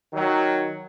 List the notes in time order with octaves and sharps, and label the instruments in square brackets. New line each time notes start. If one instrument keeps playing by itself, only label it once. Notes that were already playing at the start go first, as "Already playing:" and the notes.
[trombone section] D#3 F#3